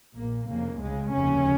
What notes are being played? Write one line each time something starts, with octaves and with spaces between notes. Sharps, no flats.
A#1 A#2 A#3
F1 F2 C#3 A#3
C#2 C#3 G#3
F1 D#2 C#3 C#4